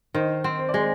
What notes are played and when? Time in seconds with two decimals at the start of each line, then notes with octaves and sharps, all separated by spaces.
0.14 D#3 C5 D#5
0.44 C4
0.59 C5
0.69 D5
0.74 G#3
0.79 G#4 C5